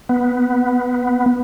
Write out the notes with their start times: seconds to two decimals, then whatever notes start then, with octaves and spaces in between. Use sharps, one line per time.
0.09 B3